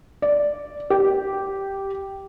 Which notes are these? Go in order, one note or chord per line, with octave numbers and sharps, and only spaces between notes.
D5
G4